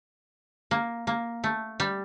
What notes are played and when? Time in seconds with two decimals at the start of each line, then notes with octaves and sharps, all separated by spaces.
0.71 A#3
1.07 A#3
1.44 A3
1.80 G3